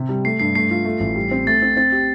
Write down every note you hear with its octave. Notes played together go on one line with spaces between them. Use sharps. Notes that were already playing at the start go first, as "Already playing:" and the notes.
Already playing: C3
G3
A3 C7
G2 C7
A3 C7
F4
A3
A1
G3
C4
A3 A6
C4
C4 A6
G4